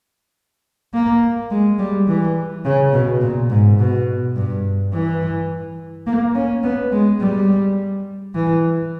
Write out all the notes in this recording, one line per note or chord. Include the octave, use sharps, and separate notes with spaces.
A#3
G#3
G3
E3
C#3
B2
A#2
G#2
B2
G2
E3
A#3
C#4
B3
G#3
G3
E3